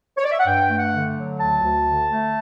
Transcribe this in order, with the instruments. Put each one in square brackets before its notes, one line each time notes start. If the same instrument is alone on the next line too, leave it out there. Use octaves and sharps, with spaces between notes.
[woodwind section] C#5
D5
E5
F#5
G2 G5
A3
F#5
D3
F#3
D2 A5
D2
D3
A3